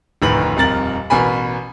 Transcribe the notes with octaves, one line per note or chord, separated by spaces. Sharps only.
F1 D2 A2 D#3 B4 F#7
D#1 F2 A#4 A6 F#7
A1 B2 A#4 G#5 B5